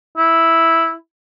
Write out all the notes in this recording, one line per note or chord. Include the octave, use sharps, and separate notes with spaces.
E4